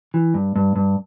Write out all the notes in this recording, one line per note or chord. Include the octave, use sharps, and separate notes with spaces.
E3
G2
G2
G2